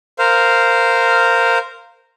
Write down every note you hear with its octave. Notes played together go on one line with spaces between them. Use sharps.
A#4 C5 F5